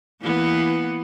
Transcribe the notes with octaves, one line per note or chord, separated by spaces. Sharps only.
E3 A#3 B3